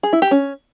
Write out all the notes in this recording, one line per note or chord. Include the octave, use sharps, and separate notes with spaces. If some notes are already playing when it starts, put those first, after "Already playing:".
G#4
E4
G4
C#4